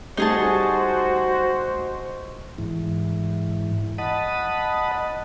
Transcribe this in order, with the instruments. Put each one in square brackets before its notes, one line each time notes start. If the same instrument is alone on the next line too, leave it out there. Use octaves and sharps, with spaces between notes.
[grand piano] G3 A3 G7 [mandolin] D#4 G#4 A5 [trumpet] F#4 [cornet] C5
[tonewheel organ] G#2 E3
D#5 F#5 A5 B5 D#6